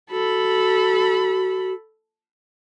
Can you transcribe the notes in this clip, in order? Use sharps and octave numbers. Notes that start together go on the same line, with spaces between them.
F#4 A4 B5